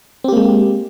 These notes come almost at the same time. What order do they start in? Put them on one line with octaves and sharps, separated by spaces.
C4 G4 A#3 G#3